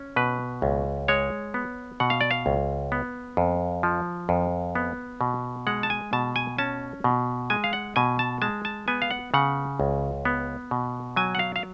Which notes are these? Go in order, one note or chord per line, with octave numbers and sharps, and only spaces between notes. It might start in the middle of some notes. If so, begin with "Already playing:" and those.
Already playing: C#4
B2 B4
C#2
G#3 C#5
B3
B2 F#5
F5
D5
F5
C#2
B3
F2
F3
F2
B3
B2
G#3 F#5
A5
G#5
B2 A5
G#5
C#4 A5
B2
G#3 G#5
F5
F#5
B2 G#5
A5
G#3 A5
A5
B3 G#5
F5
F#5
C#3 F#5
C#2
B3
B2
F#3 G#5
F#5
F5
F5